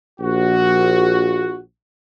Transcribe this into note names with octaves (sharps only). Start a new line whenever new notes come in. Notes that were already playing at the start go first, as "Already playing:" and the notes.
A#1 F#4